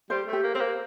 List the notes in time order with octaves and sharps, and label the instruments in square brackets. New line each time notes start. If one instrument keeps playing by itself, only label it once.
[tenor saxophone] G3 [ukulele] C5
[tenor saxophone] A3
[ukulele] G4
[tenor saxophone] A#3
[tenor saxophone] C4 [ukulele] C5
[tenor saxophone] A#3